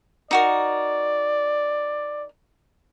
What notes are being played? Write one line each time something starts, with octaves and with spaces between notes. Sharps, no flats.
D#4 F#4 A#4 D5